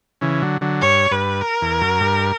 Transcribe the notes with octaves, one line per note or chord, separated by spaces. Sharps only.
C#3 E3
D3 F#3
D3 F#3
G2 C#5
G2 B4
A#4
E2
F#2
G2